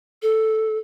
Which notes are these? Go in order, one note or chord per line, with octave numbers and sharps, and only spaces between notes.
A4